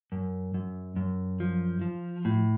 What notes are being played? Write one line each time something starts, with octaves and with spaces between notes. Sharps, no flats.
F#2
F#2
F#2
F3
F3
A2